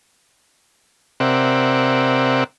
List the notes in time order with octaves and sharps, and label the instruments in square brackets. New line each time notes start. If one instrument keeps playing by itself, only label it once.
[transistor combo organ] C3 C4 A#4 D5 E5 F#5